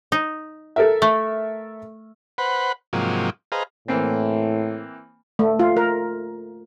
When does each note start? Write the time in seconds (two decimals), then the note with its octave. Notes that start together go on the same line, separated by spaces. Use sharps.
0.12 D#4
0.76 A4 A#4 E5
1.02 A3
2.38 B4 C5 F#5 B5
2.93 G#2 C3 F3 F#3 A#3
3.52 G#4 B4 C5 D#5 F5 A#5
3.88 A2 E3 A#3 C4
5.39 A3
5.60 F4
5.77 A#4